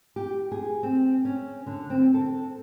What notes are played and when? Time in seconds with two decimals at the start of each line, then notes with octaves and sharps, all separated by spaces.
0.16 G4
0.52 G#4
0.83 C4
1.25 C#4
1.66 D3
1.90 C4
2.14 A4